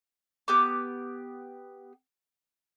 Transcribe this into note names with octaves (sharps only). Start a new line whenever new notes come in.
B3 G4 D6